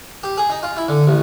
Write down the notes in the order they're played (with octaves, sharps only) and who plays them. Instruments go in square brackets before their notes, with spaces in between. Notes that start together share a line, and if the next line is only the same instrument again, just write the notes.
[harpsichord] G4
G#4
D#4
F4
E4
D3
A1